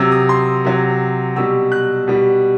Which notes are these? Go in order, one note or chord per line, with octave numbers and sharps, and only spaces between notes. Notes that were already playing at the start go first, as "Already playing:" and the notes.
Already playing: C3 F#3 E6
D#6
C6
C3 F#3
B2 G3 E6
F#6
B2 G3